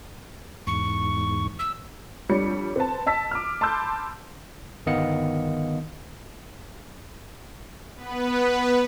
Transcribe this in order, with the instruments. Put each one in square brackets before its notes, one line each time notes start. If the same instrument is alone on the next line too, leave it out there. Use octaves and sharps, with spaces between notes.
[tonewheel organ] E2 G#2 [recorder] C#6
[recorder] E6
[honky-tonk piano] F2 G3 D4 C#5 C#7
C4 B4 A5
D#5 A5 E6 B6
D6 F6
A5 B5 C6 D6 E6 G6
[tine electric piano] G1 D#3 B3 D#5 F5 C#7
[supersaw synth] B3 B4